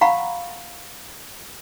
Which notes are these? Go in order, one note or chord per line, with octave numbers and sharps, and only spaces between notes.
F5 F#5 A#5 B5 C#6